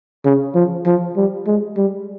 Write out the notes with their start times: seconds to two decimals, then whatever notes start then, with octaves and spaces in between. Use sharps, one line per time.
0.25 C#3
0.55 F3
0.86 F3
1.17 G3
1.47 G#3
1.77 G3